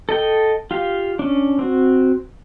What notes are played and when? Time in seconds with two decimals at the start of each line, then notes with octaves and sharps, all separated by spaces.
0.09 A4 D#5 G5
0.71 F4 G4 F5
1.19 C#4 D4
1.59 C4 F#4